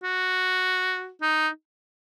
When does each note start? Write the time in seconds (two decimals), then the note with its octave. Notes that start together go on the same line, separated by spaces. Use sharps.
0.04 F#4
1.22 D#4